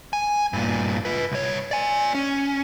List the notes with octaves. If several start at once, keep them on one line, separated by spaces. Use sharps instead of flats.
G#5
G2 A#2
F4 B4
C2 C#5
D5 G#5
C#4